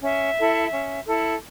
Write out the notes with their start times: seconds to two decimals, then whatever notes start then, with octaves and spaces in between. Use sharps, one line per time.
0.02 C#4 E5
0.38 E4 A4
0.72 C#4
1.07 E4 A4